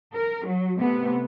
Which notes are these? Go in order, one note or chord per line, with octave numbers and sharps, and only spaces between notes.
A#4
F#3
C3 A3 B3